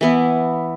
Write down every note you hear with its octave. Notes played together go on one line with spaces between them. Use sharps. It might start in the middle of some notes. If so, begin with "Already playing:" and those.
E3 B3 E4